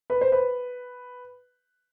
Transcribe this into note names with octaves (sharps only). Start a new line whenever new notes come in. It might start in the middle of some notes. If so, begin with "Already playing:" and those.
B4
C5
B4